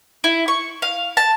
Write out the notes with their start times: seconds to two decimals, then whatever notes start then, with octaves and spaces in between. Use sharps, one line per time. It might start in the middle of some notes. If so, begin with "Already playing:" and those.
0.24 E4
0.48 C#6
0.82 F5
1.17 A5